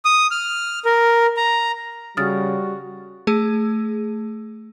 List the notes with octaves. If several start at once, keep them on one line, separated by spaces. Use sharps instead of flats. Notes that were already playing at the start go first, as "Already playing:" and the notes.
D#6
F6
A#4
A#5
C#3 G3 F#4 D#6 F6 A6
A3 G#4